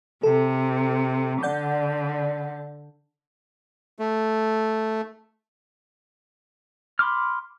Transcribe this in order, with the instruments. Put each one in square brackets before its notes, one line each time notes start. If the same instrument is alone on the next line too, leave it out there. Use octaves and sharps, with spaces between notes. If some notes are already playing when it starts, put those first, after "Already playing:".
[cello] C3 [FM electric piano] A4
[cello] D3 [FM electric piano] D5 F#5 G6
[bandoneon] A3
[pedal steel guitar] B5 C6 D6 F6